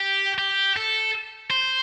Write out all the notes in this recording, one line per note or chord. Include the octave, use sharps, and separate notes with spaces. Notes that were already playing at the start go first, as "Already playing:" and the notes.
Already playing: G4
G4
A4
C5